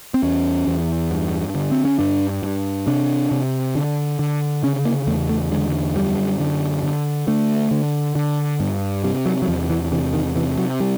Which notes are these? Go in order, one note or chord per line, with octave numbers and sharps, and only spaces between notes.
C4
E2 C#4
E2
G2
D3
C4
C#4
G2 D4
G2
C3 D4
C3
D3
D3
C#3 C#4
A#3
E2 A3
A3
D3 G#3
F#2 G3
D3
D3
D3 A3
D3
D3
G2
C3 G3
F#3
F#3
E2 F3
E3
C3 E3
D#3
C3 E3
F#3
G3